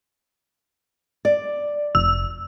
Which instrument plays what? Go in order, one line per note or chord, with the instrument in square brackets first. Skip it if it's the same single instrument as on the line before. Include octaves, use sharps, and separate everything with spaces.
[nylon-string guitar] D5
[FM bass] F1 [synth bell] E6